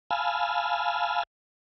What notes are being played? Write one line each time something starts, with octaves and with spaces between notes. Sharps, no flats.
F5 G#5 A5 B5 E6 F6